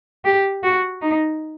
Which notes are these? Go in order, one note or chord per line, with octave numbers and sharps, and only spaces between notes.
G4
F#4
D#4